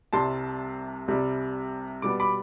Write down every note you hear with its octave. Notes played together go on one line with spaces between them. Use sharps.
C2 C3 G3 A5 C6
C2 C3 G3
B2 G3 B3 D6
B5 D6